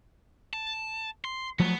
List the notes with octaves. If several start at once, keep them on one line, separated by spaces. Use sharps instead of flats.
A5
C6
F3 F#3 A3 B3